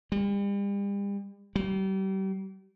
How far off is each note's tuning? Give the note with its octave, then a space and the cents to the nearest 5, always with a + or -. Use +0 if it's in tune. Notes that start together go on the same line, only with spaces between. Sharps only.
G3 +40
G3 -35